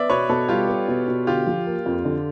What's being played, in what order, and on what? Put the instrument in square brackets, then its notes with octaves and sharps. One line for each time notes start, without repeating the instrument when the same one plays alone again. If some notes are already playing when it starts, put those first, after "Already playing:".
Already playing: [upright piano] B3 [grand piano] D5 E5
[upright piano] B2 [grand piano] B4 C#5
[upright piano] B2 [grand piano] A4 B4
[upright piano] G3 [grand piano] F4 G4
[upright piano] B3
B2
B2
[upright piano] D3 [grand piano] F4 G4
[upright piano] F3
A#3
F2
D3